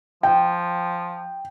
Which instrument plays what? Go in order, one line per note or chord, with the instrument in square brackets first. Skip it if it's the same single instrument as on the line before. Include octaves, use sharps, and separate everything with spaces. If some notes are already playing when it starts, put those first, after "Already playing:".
[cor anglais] F3 [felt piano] G5